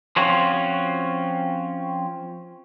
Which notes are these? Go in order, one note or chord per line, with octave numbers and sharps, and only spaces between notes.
F3 C4 C#4 F4 F#4